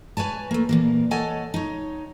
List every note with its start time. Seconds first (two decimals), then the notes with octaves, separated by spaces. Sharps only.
0.17 B4 C#5 G#5 A5
0.51 A3 A#3
0.69 A#2 E3 A#3
1.11 A4 C#5 D#5 F#5 G#5 A5
1.54 D#4 C#5